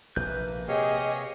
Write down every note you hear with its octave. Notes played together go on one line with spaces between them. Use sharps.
A#1 C3 A#3 B4 G6
C3 G4 G#4 C#5 D#5 F5